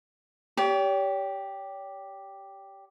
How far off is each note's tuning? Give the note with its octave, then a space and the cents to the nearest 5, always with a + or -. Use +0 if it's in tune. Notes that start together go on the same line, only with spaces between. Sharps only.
G4 +0 C#5 +45